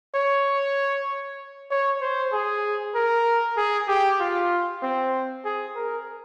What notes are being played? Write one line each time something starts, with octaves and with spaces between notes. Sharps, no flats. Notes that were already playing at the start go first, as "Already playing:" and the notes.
C#5
C#5
C5
G#4
A#4
G#4
G4
F4
C4
G#4
A#4